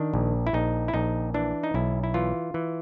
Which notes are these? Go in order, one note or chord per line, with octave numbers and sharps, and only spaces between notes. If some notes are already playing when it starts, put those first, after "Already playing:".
Already playing: D#3 D4
A#1
E4
A#1 D#4
E4
A#1 D#4
E3 D4
D#4
B1 E4
E4
E3 F4
E3